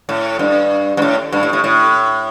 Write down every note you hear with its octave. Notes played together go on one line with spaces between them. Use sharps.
A2
G2
G2
A2
G2
A2
A2
A2